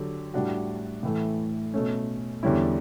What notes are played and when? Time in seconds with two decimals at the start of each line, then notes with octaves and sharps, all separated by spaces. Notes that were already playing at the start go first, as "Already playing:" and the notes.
Already playing: D3 F#3 G4
0.34 A2 G3 D4 F#4
1.03 A2 E3 A3
1.74 B2 A3 C#4
2.43 E2 D3 G3 C#4 E4